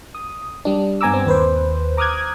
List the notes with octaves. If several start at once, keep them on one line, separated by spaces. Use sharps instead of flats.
D#6
G3 D4
G2 B3 G#5 A#5 D6 E6
C4
D#2 B4 C5
A#5 D6 D#6 F6 F#6 G#6